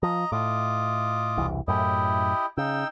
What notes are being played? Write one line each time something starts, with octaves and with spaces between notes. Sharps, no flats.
F3 D#5 A#5
A2 F4 D#5 D6
E1 C2 E3
F#2 A2 E4 G4 D#5
C#3 D#4 G5 E6